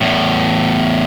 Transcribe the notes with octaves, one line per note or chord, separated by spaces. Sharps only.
E2 A2